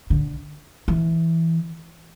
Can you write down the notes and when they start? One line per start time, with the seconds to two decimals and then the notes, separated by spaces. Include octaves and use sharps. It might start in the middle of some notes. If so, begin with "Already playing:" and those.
0.10 D3
0.88 E3